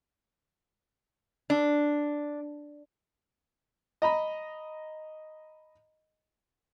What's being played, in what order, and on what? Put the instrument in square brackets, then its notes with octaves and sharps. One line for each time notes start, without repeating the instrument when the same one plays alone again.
[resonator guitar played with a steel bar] D4
[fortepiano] D#5 A#5 B5